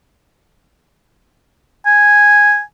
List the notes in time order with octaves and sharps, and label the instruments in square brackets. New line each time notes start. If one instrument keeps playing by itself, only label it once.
[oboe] G#5